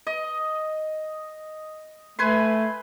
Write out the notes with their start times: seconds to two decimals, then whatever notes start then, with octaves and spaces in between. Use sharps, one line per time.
0.07 D#5
2.19 A3 B4 G#5 C6